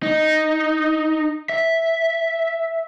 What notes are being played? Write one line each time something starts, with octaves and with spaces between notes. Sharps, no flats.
D#4
E5